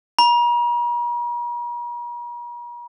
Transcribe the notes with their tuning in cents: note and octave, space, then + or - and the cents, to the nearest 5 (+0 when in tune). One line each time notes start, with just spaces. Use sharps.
A#5 +45